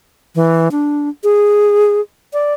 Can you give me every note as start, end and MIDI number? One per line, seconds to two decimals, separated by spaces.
0.35 0.68 52
0.71 1.09 62
1.24 2.01 68
2.33 2.54 74